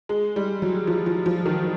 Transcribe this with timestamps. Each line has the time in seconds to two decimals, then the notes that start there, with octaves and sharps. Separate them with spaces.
0.09 G#3
0.36 G3
0.62 F#3
0.87 F3
1.06 F3
1.26 F3
1.46 D#3